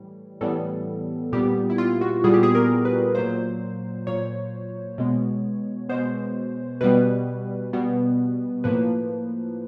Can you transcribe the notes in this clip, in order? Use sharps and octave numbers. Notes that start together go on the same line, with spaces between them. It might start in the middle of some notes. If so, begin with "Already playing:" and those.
Already playing: A2 E3 G3
A2 E3 G3 B3 A4
A#2 G3 B3 G4
E4
F4
F#4
A#2 G3 B3 G#4
G4
G#4
A#4
B4
A#2 F#3 A#3 C5
A#2 F#3 A#3 C#5
B2 G#3 B3
B2 G#3 B3 C5
B2 G3 B3 B4
B2 G3 B3
A2 F3 A#3 B4